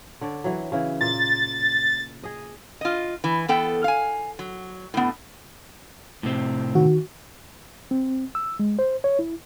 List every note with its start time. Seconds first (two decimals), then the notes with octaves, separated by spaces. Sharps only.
0.21 D3 C#5 D5
0.44 E3 F#3
0.72 C#3 E3
1.01 A#2 A6
2.24 G#4 D#5
2.81 F4 D#5
3.24 E3
3.48 E2 B3 A4 G5
3.84 F5 G#5
4.39 F#3
4.94 A2 B3
6.23 A2 C3 C4
6.75 D#3 F#4
7.91 C4
8.35 E6
8.59 G#3
8.79 C5
9.04 C#5
9.19 E4